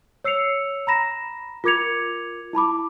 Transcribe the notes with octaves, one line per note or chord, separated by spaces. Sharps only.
C#5 E6 C7 C#7 F7
A#5 B5 A#6 E7
F4 A#4 D6 G#6 C#7 F7
E4 A5 B5 D6